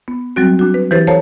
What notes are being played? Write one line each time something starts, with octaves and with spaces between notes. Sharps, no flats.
B3
F#3 G3 C4 F#4
D4 F#4
B4
E3 E4 G4 B4 C5 A6
A4 C5 C#5 F5 A5 A#5